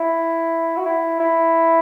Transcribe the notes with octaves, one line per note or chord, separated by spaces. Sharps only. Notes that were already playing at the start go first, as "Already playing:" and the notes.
Already playing: E4
F#4
E4
E4